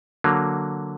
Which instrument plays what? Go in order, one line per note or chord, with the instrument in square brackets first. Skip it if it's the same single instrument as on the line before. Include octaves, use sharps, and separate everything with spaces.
[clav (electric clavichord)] D3 F#3 A#3